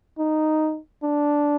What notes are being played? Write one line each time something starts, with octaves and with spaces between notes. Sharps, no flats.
D#4
D4